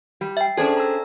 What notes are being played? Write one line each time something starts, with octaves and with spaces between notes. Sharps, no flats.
G3
E5 G5
C#4 D4 G#4 A4 C5 G#6
A#5 E6